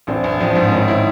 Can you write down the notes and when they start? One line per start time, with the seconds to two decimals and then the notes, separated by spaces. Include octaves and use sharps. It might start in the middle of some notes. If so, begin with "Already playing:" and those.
0.07 A1 C4 D4
0.24 A1
0.40 F3 C4 D4
0.55 G#2
0.71 D#3 C#4 D#4
0.88 E4